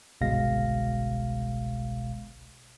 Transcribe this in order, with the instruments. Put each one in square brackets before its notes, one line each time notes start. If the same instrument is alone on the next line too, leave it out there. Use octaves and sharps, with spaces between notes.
[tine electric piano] G1 C2 B2 G#3 F5 A#6